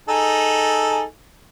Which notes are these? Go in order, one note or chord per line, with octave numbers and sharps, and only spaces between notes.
D#4 G#4 A4